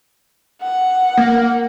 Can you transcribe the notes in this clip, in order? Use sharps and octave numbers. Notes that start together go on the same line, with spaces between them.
F#5
A#3